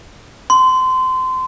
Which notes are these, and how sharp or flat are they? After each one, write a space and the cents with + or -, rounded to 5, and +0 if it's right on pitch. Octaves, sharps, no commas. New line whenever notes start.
C6 -25